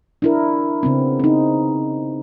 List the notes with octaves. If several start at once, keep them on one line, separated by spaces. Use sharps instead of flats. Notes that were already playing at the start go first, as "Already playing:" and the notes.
D4 E4 A#4
C#3 B3 C4
C4 D#4